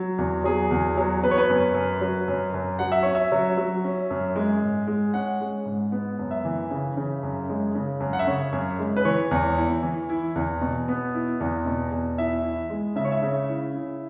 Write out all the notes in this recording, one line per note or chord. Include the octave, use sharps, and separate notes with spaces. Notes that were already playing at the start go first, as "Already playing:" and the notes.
Already playing: F#3
E2
F#3 G#4
E2
F#3
B3 B4
C#5
B4
F#2
F#2
F#3
F#2
F#2
F#3 F#5
E5
C#4 C#5
E5
F#3
F#3
C#4
F#2
G#3
G#2
G#3
C#4 F#5
G#3
G#2
B3
F#2
E5
E3
C#3
C#3
F#2
G#3
C#3
F#2
F#5
E5
C#3 C#5
F#2
G#3
B4
E3 C#5
E2
E4
E3
E4
E2
B2
B3
E4
E2
B2
E2
E4 E5
E4
G#3
C#3 E5
C#5
E5
C#3
E4
E4